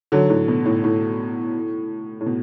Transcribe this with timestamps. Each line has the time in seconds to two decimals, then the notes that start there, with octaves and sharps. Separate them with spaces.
0.12 D3 F#3
0.29 A2 D3
0.48 B2
0.65 A2
0.84 A2
2.21 A2
2.26 B2